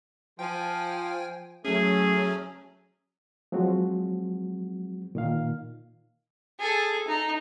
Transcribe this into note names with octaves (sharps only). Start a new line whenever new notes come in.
F3 G5 G#5
F#3 A3 C#4 G#4
F3 F#3 G#3 C4 F#4
A#2 D#3 F5
G#4 A4
D#4